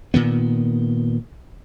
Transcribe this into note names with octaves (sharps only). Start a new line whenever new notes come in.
A#2 D#3 B3